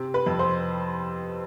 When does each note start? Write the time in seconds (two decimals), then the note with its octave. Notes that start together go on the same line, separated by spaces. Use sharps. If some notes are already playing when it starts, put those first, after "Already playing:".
Already playing: C3 C4
0.14 B4
0.26 F2
0.39 C5